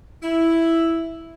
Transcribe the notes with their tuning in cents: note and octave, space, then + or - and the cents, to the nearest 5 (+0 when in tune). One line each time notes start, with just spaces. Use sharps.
E4 +0